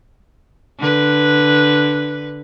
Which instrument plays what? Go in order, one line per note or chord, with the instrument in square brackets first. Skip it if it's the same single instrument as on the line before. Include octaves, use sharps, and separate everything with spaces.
[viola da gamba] D3 B4